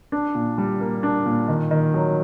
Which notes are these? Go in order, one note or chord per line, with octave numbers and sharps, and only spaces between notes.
D4
A#2
G3
A#3
D4
A#2
D#3
D#3
F#3